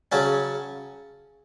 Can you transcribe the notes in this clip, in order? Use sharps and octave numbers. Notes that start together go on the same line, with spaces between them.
C#3 F#3 C#4 A5